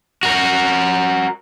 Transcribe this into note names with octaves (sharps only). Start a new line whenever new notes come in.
F#4 A#4